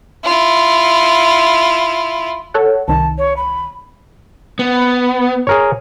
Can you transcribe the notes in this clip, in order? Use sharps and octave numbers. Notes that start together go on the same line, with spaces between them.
E4 F4
A4 C#5 F#5
C2 D#3 A5
C#5
B5
B3
G#4 A#4 C#5